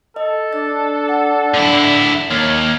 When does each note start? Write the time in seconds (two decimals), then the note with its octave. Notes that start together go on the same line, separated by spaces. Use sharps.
0.16 A4 D#5
0.53 D4 A6
1.09 F#5
1.54 D3 E4
2.31 D#2 C#5 A5 F6 G#6